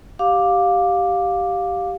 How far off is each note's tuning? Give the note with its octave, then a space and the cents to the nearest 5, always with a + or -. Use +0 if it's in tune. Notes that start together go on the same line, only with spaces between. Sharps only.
G4 -10 F5 +15 D6 +0